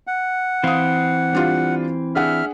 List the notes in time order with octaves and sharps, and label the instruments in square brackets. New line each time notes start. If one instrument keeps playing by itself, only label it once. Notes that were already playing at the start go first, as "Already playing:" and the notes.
[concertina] F#5
[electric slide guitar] E3 C4 [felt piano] F5 D#6
[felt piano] G3 D4 F4
[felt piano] D4 G#4 F#5 [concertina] E5 F6